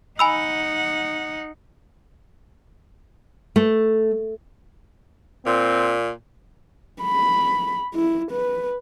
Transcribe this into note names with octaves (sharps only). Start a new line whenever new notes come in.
D#4 F#5 G#5 B5 E6
A3
A#2 C4
B5
E4
B4